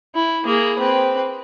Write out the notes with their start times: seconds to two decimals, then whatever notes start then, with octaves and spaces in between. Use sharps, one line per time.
0.15 E4
0.45 A#3 G#4
0.79 C4 B4